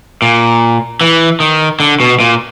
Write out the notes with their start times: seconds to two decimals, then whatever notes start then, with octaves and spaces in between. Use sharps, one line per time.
0.22 A#2
1.01 E3
1.40 D#3
1.80 D3
2.00 B2
2.20 A#2